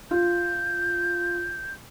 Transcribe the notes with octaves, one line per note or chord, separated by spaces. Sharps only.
F4 G6